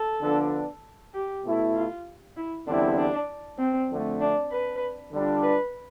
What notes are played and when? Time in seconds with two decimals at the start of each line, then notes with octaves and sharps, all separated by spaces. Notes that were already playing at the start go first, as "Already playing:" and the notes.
Already playing: A4
0.22 D3 F3 B3 D4
1.13 G4
1.44 B2 A3 E4
1.75 F4
2.37 E4
2.67 E2 D3 G3 C4 D4 E4
2.98 D4
3.58 C4
3.90 F2 D3 A3
4.21 D4
4.51 B4
5.12 D3 G3 D4 F4
5.43 B4